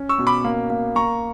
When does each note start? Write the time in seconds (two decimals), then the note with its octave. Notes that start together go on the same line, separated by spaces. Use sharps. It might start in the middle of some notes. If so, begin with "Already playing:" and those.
Already playing: C#4
0.09 C#6 E6
0.19 B2
0.27 B5 D6
0.44 A#3
0.70 A#3
0.95 A#3 A#5 C#6